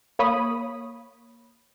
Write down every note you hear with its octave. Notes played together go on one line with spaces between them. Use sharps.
A#3 C#5 B5 D#6